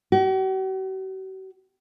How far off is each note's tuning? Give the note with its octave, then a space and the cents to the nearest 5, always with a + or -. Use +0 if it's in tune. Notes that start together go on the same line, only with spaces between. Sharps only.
F#4 +45